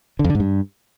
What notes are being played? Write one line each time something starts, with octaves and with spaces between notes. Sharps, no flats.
D3
F2
D3
G#2
G2